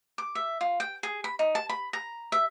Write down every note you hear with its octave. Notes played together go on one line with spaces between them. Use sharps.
D6
E5
F4
G5
G#4
B5
D#4
A5
B5
A#5
E5